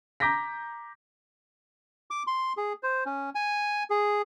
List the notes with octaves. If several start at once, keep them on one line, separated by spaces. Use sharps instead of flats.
A#5 D6 G6 A#6 B6
D6
C6
G#4
C5
C#4
G#5
G#4